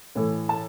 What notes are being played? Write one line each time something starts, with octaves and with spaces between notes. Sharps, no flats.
A2 E3 A3
A5